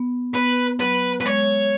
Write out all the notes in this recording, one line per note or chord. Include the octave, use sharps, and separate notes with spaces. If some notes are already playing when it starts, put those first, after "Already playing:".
Already playing: B3
B3 B4
F#3 B4
B4
G#3 C#5